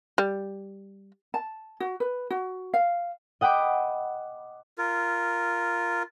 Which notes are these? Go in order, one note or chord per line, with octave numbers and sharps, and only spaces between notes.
G3
A5
F#4
B4
F#4
F5
D#5 F#5 G5 B5 D6
F4 A#4